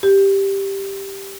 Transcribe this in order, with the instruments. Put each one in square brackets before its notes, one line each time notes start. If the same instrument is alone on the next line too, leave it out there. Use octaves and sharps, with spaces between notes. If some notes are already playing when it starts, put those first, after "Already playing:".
[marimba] G4